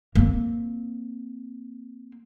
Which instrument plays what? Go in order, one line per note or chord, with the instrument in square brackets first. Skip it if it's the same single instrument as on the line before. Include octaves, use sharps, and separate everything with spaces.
[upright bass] A#3 C4